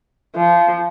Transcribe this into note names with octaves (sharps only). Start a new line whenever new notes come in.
F3